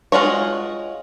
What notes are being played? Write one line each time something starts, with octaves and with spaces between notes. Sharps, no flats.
G#3 F4 F#4 C#5